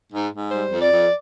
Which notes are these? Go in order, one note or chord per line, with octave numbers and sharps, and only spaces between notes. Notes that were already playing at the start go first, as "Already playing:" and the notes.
G#2
G#2
G3 C5
F2
D5
F2